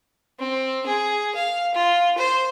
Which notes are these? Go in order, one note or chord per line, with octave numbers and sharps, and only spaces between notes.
C4
G#4
F5
F4
C5